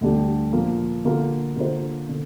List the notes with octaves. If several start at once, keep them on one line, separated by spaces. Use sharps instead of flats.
D2 D3 G3 D4 G4
A#2 F3 A#3
D3 A#3 F4 A#4
D3 A#3 F4 C5
D3